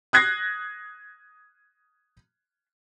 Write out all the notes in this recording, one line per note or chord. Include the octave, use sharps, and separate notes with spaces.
D#6 F#6 G#6 A#6 C7